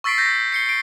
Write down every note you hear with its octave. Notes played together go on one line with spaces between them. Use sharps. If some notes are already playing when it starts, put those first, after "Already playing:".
C#6 E6 A6 B6 C7 D7
G6 A#6
C7 C#7 G7
C7 D7